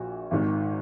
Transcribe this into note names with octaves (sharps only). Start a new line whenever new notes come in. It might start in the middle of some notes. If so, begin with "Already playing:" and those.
Already playing: A#1 A#2 F#4
G#1 G#2 D#3